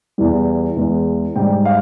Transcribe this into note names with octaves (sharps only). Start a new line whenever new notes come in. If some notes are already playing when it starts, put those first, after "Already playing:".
E2 E3 G3
E2 E3 G#3
G#2 G3 G5
F5